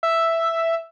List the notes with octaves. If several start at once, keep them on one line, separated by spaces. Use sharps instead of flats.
E5